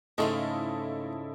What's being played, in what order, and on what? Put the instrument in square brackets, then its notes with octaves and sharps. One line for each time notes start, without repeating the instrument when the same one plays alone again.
[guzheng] G#2 C#3 F4 [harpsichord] A3 [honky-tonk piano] E4 A4 D#5